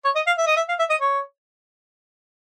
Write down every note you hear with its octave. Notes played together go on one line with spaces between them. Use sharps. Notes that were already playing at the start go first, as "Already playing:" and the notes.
C#5
D#5
F5
E5
D#5
E5
F5
E5
D#5
C#5